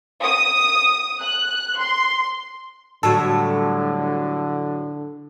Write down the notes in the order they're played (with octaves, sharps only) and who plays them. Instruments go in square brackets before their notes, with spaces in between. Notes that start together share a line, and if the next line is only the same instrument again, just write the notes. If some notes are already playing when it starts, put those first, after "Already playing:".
[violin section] D#6
F#6
C6
[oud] A2 F#3 G3 [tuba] D3 [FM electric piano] A4